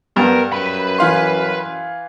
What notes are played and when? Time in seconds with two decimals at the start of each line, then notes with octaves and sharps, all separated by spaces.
0.17 G2 B3 A#4
0.52 F#2 B4 B5
0.98 E3 F5 C6